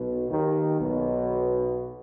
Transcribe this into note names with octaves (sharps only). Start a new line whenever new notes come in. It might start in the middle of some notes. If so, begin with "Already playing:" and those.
Already playing: B1 B2
D#2 D#3
B1 B2